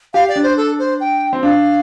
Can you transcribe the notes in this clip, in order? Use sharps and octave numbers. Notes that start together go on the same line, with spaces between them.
G4 F5
D5
D4
C5
A4
C5
G5
C4
D4 F5